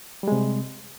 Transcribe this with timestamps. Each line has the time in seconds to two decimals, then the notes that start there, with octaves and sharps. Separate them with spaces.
0.23 G3
0.28 G#3
0.32 C3